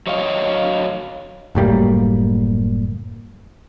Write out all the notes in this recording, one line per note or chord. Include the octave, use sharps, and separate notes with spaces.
F#3 C#5 D#5 F5
F#1 A2 G3 A#3